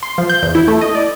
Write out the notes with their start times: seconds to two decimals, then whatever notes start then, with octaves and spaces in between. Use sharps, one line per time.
0.03 C6
0.18 F3
0.29 G6
0.43 E2
0.55 E4
0.68 A3
0.81 D#5
0.95 D5